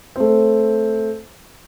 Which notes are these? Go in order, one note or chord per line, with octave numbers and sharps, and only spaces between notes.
A3 C4